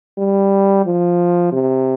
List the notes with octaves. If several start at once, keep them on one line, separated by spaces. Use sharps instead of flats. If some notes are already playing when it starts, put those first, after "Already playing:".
G3
F3
C3